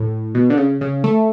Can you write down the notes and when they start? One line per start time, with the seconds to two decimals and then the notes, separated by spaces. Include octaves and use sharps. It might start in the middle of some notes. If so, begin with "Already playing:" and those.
Already playing: A2
0.35 B2
0.50 D3
0.57 C#3
0.81 C#3
1.04 A3